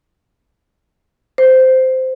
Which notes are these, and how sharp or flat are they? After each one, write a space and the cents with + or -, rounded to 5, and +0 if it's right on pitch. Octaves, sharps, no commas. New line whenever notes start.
C5 -10